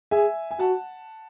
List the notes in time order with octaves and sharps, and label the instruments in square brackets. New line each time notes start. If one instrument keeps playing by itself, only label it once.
[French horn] G#4 [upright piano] E5 G#5
[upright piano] G#5
[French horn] F#4 [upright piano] F#5 A5